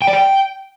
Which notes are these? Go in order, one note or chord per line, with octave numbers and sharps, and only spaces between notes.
G5
D5
G5